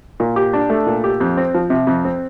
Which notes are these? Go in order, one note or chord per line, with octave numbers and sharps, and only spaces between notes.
A#2
G4
D4
A3
A#2
G4
F2
C4
F3
C3
F2
C4